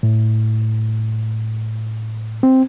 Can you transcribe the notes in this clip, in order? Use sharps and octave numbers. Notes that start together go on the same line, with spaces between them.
A2
C4